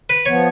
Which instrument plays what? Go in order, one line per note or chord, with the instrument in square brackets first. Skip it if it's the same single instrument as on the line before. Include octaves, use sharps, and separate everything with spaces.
[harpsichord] B4
[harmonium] F3 B3 [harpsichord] C#5